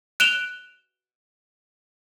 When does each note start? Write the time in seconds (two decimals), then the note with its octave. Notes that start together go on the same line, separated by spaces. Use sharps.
0.20 F#6 D7 E7 F7 G7